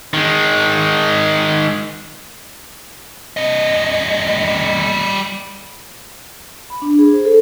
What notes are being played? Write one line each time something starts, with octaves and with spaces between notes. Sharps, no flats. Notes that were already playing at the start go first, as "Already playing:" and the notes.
D#3 G#3
G3 D#5
B5
D4
G#4
C5
A4